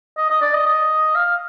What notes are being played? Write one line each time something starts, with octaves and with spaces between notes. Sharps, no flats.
D#5
D#5
D5
D#5
D#5
F5